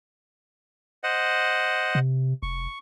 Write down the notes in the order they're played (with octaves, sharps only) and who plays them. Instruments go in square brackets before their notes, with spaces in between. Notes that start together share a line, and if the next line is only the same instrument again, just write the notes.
[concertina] C5 D#5 F#5
[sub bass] C3
[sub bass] F1 [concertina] C#6